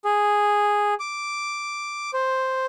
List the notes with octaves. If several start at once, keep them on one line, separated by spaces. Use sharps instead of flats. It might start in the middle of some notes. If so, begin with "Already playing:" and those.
G#4
D6
C5